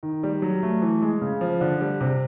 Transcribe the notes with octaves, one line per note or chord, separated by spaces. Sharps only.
D#3
G3
F#3
A3
E3
G#3
C#3
F3
D3
G3
C3